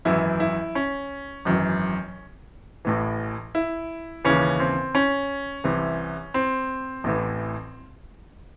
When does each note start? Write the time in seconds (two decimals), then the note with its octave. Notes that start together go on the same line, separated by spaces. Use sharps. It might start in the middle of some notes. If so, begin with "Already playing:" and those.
0.05 G#1 F#2 E3 E4
0.40 E4
0.75 C#4
1.45 G#1 F#2 E3
2.85 A1 A2 E3
3.55 E4
4.25 D#2 C#3 E3 C#4
4.60 C4
4.95 C#4
5.64 C2 C3 E3
6.34 C4
7.04 A1 A2 E3